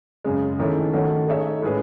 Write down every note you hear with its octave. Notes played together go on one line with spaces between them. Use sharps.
F#2 C#3 G#3
E2 D#3 A3 C#4 E4
D#3 A3 C#4 F#4
A3 D#4 G#4 C#5 E5
A2 G#3 C#4 G#4 B4